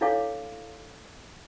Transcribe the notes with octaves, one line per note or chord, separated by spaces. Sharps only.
D4 E4 A4 C#5 F5 D6